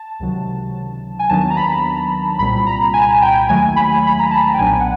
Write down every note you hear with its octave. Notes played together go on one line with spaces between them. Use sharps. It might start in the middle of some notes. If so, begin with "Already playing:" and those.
Already playing: A5
C#2 C3 D#3 F#3
G#5
D#2 D#3 F#3 B3 D4 A5
A#5
B5
C2 A#2 G3 C4 B5
A#5
G#5
G5
D#2 D#3 F#3 A3 G#5
B5
B5
A#5
A5
G5
B1 A#2 F#3 B3 D4 G#5
F#5